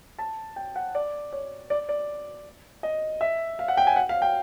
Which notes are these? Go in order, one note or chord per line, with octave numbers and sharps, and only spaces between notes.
A5
G5
F#5
D5
C#5
D5
D5
D#5
E5
F5
F#5
G5
G#5
F#5
F5
G5